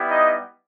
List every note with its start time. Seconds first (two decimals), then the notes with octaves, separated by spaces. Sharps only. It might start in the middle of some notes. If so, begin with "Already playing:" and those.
Already playing: G3 B3 E4 G4
0.10 D#4 D#5